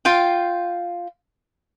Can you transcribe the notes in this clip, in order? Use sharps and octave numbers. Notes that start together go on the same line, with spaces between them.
F4 F5 G5